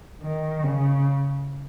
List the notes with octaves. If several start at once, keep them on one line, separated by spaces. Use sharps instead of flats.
D#3
C#3